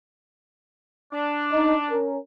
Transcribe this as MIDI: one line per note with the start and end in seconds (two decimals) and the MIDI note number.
1.13 1.96 62
1.51 1.75 63
1.89 2.16 61
1.89 2.16 70